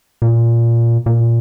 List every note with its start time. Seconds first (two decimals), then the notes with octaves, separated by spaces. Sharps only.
0.22 A#2
1.06 A#2